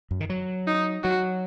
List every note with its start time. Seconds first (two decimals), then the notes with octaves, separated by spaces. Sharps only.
0.11 F#2
0.20 D#3
0.30 F#3
0.67 D#4
1.03 F#3 F#4